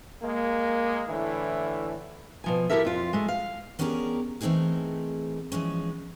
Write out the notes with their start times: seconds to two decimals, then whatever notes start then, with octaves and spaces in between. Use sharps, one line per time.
0.23 G#3 A#3
1.08 A2 D3 E3
2.44 B2 F3 G#5
2.70 E4 G4 A4 A#4 E5
2.85 F2 F4
3.13 G#3 A3
3.28 F5
3.79 B3 C#4 D4 G4 G#4 A#4
4.41 E3 A3 C4 D#4 G#4 A#4
5.52 E3 F3 G#3 C#4